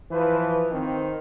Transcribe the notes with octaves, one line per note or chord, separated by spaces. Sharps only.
E3 F3 B4
D#3 C4